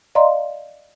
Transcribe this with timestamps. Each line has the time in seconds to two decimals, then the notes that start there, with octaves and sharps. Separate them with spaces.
0.15 D5 D#5 F5 A#5 C6